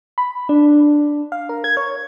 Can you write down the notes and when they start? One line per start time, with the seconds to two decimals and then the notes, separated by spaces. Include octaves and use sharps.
0.18 B5
0.49 D4
1.32 F5
1.49 A#4
1.64 G#6
1.77 C#5